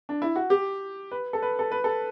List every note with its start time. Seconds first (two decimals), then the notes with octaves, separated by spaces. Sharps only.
0.09 D4
0.22 E4
0.36 F#4
0.50 G4
1.11 B4
1.33 A4
1.42 B4
1.59 A4
1.71 B4
1.84 A4